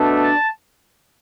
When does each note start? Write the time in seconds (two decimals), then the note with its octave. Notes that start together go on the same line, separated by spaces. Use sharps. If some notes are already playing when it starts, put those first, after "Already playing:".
Already playing: B2 A3 D4
0.21 A5